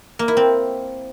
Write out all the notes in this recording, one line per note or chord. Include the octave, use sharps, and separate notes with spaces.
A#3
E4
C4